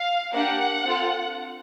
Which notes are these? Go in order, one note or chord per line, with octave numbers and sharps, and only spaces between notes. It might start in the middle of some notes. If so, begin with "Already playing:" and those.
Already playing: F5
A#3 D4 G4 F#5
C4 F4 A4